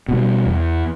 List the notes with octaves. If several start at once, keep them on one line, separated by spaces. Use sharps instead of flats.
B2 G3
E2